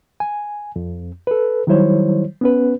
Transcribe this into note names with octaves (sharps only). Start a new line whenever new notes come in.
G#5
F2
A4 B4
D#3 F#3 G3 E4 C5 C#5
B3 C#4 B4